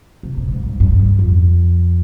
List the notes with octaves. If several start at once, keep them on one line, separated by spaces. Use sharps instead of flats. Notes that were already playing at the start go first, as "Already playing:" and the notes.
C3
B2
G#2
G2
G2
G2
F2